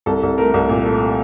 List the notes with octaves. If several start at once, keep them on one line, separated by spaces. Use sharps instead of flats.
C2 A4
C2
A3 A#4
C2
A#2
A3